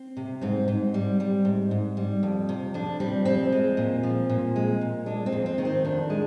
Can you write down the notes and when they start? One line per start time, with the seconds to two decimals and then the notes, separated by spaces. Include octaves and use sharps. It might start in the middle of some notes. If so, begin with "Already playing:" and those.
Already playing: C4
0.17 C3
0.41 G#2 C4
0.68 G#2
0.94 G3
1.20 G3
1.45 G#2
1.71 G#2
1.97 G3
2.23 F2
2.49 C3
2.74 F2 D4
3.00 G3 C4
3.25 F2 C4
3.52 G#3
3.77 A#2
4.03 F3
4.30 A#2
4.56 G#3
4.81 A#2
5.06 G#3 D4
5.26 C4
5.32 F2
5.46 C4
5.58 D#3
5.65 C4
5.85 F2 D4
6.10 G#3